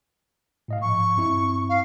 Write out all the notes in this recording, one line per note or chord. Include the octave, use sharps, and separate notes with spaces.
A2 D#5 F5
G#2 F3 C#6
G2 C4 E4
F5